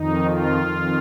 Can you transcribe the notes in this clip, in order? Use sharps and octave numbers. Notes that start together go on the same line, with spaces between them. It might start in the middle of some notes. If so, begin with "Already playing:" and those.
Already playing: F2 D#3 D#4
F4
F2 D#3